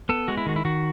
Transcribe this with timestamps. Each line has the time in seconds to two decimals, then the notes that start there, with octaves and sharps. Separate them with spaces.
0.09 B3 A4
0.28 G#3 F#4
0.37 E4
0.46 D#3 F#4
0.56 E4
0.65 D#3 F#4